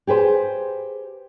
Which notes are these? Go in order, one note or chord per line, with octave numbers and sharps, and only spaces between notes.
G4 G#4 B4 C5